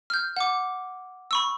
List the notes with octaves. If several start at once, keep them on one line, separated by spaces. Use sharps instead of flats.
F6 G6
F#5 D6
B5 C#6 E6